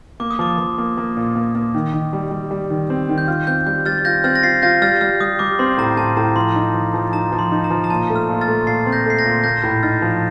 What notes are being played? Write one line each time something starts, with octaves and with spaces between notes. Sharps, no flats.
A#3 D6
D#6
F3 D6
F3
A#3
A#3
A#2
A#3
A#3
D#3
D#3
G3
G3
G3
D#3
C4
D#3
G6
F4 F6
C4 G6
G3 G6
G3 F6 A6
A6
F4 G6 A#6
C4 F6 A6
A#6
F4 A6 C7
F4 G6 A#6
G3 F6 A6
G3 F6
G3 D#6
G3 D6
C4 C6
A2 A#5
A2 A5
A2 A#5
F3 C6
D#4
F3
F3
D#4 A#5
F3
C6
D#4
A#5
F3
A#5
A#2 A5
A3
F6
A#2
F6 A6
A3
A#2 A6 C7
C4
G6 A#6
A3 C7
G6 A#6
A#2
A#3 G6 A#6
A2
D#4 F6 A6
F3